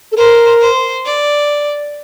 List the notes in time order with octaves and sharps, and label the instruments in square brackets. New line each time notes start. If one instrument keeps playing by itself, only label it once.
[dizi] A4
[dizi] A#4 [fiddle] C5
[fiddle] C5
D5